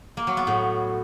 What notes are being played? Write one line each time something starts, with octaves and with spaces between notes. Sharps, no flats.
A#3
F#3
B3
A2